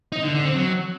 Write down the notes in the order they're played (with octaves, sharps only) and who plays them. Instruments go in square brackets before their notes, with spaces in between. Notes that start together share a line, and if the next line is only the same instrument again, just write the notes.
[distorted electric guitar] D#4
D3
D3
C4
F#3